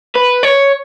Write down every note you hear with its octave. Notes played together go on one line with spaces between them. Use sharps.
B4
C#5